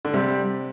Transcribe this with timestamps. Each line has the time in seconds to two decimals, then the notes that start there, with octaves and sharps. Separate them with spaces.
0.05 D3
0.14 C3 G3